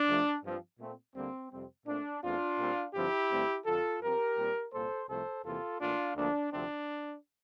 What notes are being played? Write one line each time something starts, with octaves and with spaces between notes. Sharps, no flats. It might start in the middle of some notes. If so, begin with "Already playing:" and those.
Already playing: D4
F2 C3 F3 A3
G2 F3 C4
A#2 A3 C4
D2 D3 G3 A#3 C4
F2 C3 G3 C4
A#2 A3 C4 D4
E2 E3 A3 C4 D4 F4
A#2 G3 C4
G2 D3 F3 C4 E4 G4
G2 D3 A3 C4
F2 D3 F3 F4 A4
G2 F3 C4 G4 A#4
A#2 G3 C4
C2 A#2 G3 A#3 A4 C5
C2 C3 F3 A3 A4 C5
E2 C3 E3 A#3 F4 A4
A2 E3 A#3 D4 F4
D2 D3 F3 A#3 D4
D2 C3 F3 A3 C4 D4